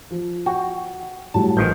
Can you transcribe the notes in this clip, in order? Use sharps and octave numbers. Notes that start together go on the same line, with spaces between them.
F3
F#4 G5
A2 F#3 G3 A5
A1 D#3 F3 G6